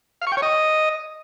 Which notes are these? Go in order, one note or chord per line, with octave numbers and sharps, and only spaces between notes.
F5
C#6
G5
C#5
D#5